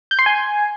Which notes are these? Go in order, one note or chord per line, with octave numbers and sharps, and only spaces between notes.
G6
C6
G#5